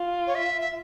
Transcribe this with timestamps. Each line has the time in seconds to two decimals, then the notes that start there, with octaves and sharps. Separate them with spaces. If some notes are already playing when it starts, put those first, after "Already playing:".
Already playing: F4
0.27 C#5
0.35 E5
0.61 E5